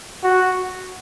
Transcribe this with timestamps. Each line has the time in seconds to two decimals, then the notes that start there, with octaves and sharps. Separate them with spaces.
0.24 F#4